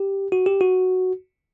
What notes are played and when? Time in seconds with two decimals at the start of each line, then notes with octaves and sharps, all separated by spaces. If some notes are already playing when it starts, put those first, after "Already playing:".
Already playing: G4
0.32 F#4
0.46 G4
0.61 F#4